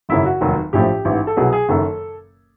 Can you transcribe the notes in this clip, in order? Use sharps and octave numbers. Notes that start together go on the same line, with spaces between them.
G#1 F#2 C#3 E4
F#4
F1 D#2 D#3 F#3
A#1 A2 F3 G4
A1 G#2 E3
A4
C2 B2 F#3 G#4
G#4
F#1 F#2 D#3 A4